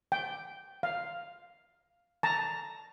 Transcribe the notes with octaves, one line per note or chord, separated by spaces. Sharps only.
G5
F5
A5 A#5